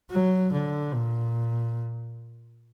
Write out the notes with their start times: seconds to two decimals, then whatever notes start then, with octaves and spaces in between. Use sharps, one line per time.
0.11 F#3
0.52 D3
0.94 A#2